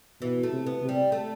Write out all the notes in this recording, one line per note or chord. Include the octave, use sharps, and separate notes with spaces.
B2 E3
A3
C3
B3
C3
G3
A3